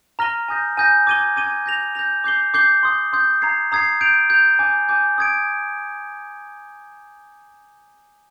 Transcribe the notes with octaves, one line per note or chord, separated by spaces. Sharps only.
A#5 F6 A#6 D#7 G7
G#5 D#6 G6 A#6
G#5 D#6 G6 A#6
D6 G#6 D#7 G7
D6 G#6 D#7 G7
G6 A#6 F7
G6 A#6 F7
D6 G6 C7 G7
D6 G6 C7 G7
C6 D#6 G6
C6 D#6 G6
A#5 D#6 G#6 C7
A#5 D#6 G#6 C7
G6 D7 F7
G6 D7 F7
G#5 D6 G6
G#5 D6 G6
D#6 G#6 D7